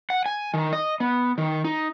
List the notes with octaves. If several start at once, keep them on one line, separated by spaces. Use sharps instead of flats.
F#5
G#5
D#3
D#5
B3
D#3
D#4